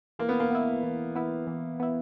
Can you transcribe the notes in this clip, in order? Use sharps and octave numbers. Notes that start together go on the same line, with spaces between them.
E3 A#3
B3
A#3
B3 E4
E3
B3 E4
E3
B3 E4